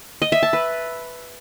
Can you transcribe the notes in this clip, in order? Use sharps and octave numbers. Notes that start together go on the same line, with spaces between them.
D#5
E5
A5
B4